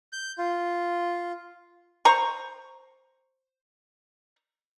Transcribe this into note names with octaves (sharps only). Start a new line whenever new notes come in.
G6
F4
C5 A#5 C#6